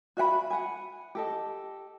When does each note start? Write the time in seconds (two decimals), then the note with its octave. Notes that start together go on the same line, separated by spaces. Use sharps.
0.17 F#4 E5 F#5 B5
0.50 F#5 G#5
1.15 G4 A4 D#5